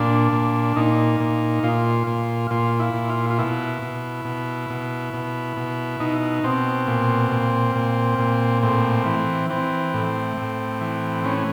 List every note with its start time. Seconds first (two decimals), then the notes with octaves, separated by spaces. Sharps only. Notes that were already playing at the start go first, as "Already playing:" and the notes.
Already playing: A#2 D4
0.32 A#2
0.76 A#2 D#4
1.20 A#2
1.63 A#2 F4
2.07 A#2
2.51 A#2 F4
2.79 E4
2.94 A#2
3.09 F4
3.30 F4
3.39 B2 E4
3.82 B2
4.25 B2
4.70 B2
5.14 B2
5.57 B2
6.00 B2 D#4
6.44 B2 C4
6.87 A#2
7.32 A#2
7.75 A#2
8.19 A#2
8.62 A2 C4
9.06 E3
9.49 E3 C4
9.94 A2
10.37 A2
10.81 E3
11.24 E3 C#4